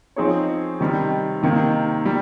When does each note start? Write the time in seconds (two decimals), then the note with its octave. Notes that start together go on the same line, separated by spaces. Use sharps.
0.16 F3 C4 D#4 G#4 C#5
0.80 C3 D#3 G3
1.42 C3 D#3 A#3
2.06 G3